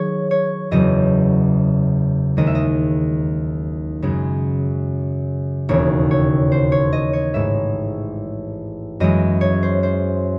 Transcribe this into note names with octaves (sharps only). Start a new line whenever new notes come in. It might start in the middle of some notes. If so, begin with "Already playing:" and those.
Already playing: D#3 F#3 G#4 C#5
C#5
F#1 E2 C#3 F#3 D#5
D#2 D#3 G#3 D#5
E5
D#5
F#2 C#3 G#3
E1 D#2 C#3 C#5
C#5
C5
C#5
D#5
C#5
A1 G#2 E3 G#3 E5
F#2 E3 G#3 D#5
C#5
C5
C5